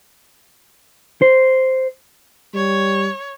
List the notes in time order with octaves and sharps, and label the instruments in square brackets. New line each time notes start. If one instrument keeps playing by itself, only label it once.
[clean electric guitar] C5
[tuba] G3 [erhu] C#5